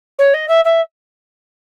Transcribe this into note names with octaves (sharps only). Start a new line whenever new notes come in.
C#5
D#5
E5
E5